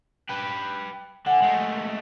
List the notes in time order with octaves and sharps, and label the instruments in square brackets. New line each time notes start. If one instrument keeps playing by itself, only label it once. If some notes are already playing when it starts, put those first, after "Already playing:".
[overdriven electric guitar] G4 B4
[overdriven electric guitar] D3 [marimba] F#5 G#5
[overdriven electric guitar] G#3 A3